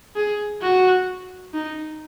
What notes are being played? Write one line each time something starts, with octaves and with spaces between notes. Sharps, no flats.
G#4
F#4
D#4